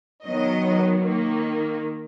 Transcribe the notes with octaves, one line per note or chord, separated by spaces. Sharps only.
D#3 F#3 B3 D#5
D#3 A#3